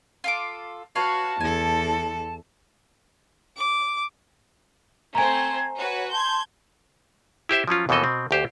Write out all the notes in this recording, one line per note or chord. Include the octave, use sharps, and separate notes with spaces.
F4 A4 D6
F#4 B4 C#5 F5 A5
E2 A4 G#5
D6
A3 C4 C5 G#5 A#5 G#6
F#4 B4 C#5
A5 C6 G6 G#6
E4 G4 C5 E5
F3 F#3 C#4 F4
D#2 B2 E3 C4 A4 D#5
B2 C4
D2 G4 C5